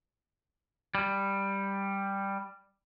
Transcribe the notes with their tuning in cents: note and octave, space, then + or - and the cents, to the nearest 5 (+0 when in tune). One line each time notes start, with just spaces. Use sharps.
G3 +5